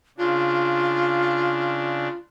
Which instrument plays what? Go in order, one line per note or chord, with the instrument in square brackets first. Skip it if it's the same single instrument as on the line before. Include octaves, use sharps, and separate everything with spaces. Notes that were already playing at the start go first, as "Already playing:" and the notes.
[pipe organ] C#3 D4 [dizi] F4